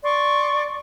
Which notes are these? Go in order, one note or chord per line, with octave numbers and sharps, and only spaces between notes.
D5 C6 C#6